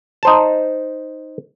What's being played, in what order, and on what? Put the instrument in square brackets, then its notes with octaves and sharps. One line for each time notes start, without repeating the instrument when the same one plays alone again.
[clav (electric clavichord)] D#4 C5 A5